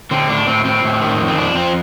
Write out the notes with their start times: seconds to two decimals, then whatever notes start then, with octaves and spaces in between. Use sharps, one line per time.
0.11 D3 C4
0.29 A2 D4
0.47 A2 C4
0.65 A2 C4
0.84 A2
1.02 D#3
1.19 F2
1.27 C4
1.37 F2 D4
1.55 F2 C4